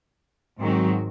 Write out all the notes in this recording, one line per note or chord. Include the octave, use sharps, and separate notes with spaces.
G#2 D#3 F#3 C4 F#4